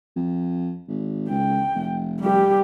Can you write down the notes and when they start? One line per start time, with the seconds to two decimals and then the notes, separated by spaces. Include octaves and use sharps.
0.16 F2
0.88 G#1
1.30 C#2 G5
1.75 F1
2.20 G3 G4